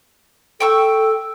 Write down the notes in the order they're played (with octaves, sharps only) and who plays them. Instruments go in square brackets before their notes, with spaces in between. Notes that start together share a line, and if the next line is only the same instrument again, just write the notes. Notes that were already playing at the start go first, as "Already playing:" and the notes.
[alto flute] A4 [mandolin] G5 C#6 E6